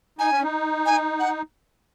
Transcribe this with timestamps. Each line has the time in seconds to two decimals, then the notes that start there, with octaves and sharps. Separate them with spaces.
0.19 D#4 G#5
0.31 C#4
0.42 D#4
0.86 G#5
1.19 F#5